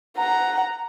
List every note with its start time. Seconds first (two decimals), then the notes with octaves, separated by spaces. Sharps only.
0.18 F#5 A#5